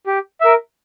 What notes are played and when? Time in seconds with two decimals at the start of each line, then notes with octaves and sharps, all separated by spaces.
0.07 G4
0.41 A#4 E5